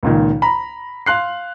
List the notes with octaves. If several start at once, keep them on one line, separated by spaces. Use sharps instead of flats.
C#2 A#2 D#3
A#5 B5
F5 C6 F#6 C7